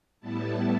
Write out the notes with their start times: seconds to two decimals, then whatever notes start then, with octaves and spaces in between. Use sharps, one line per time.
0.20 A2 G3 B3 E4 A5